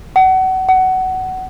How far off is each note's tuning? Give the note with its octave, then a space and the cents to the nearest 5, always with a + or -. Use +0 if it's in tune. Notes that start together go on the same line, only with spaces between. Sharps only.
F#5 +30
F#5 +20